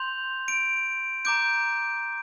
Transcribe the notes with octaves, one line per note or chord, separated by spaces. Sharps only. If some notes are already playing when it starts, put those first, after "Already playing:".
Already playing: C6 G6 F7
D7
A#5 D6 G6 D7